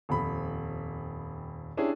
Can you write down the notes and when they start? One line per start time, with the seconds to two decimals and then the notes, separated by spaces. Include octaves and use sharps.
0.09 D#1 F2 B5
1.77 C#4 D4 E4 G4 G#4